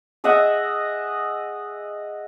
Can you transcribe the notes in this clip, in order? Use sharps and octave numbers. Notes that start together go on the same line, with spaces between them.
G#4 D#5 E5 F#5